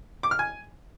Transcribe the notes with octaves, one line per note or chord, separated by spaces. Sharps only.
D6
F6
G#5